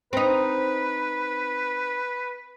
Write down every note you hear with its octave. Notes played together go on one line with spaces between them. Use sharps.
C4 D#4 B4